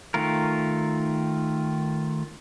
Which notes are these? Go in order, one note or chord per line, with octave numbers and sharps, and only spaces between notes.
D#3 A3 F4 A#4